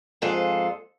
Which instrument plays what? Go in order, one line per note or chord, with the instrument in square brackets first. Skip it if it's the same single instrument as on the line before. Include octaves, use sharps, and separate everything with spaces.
[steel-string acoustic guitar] F2 G#2 F4 G#4 A4